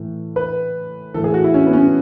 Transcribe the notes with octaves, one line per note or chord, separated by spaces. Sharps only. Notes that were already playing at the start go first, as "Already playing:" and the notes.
Already playing: A2 E3
B4
A2 E3 A4
G#4
F#4
E4
C#4
B3
C#4